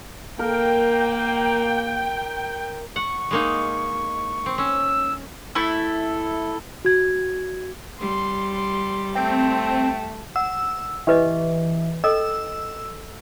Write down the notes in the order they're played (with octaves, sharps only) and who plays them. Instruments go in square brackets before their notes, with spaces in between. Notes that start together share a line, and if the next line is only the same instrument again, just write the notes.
[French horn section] A#3 [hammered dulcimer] A#4 [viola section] G5
[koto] F#5 [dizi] C#6
[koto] G#3 A#3 D#4
C4
[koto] C#4 [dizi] E6
[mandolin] A3 E4 A4
[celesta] F#4 G#6
[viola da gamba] G3 [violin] C6
[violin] C6
[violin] A3 [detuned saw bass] C4 [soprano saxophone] G5
[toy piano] F#5 [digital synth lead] E6
[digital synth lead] E3 [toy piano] G4 B4 D#5
[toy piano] A4 D#5 G5 [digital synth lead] E6